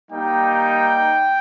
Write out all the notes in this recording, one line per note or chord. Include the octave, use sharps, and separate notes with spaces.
G3 A#3 D#4 G5